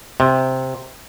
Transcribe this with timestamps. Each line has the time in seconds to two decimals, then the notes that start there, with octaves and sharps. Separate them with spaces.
0.20 C3